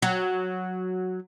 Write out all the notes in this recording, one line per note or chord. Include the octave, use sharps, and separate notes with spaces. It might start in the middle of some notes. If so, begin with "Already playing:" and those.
F#3